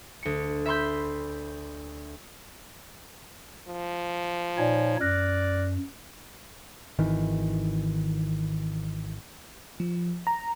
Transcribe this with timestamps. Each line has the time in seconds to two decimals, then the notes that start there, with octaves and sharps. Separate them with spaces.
0.23 D2 C#7
0.66 E5 B5 C6 G6
3.68 F3
4.58 A#2 D#4 C#5 D5 G5 G#5
5.01 F#2 D5 F6 F#6 A#6
6.99 G#1 D#3 E3
9.80 F3
10.27 A#5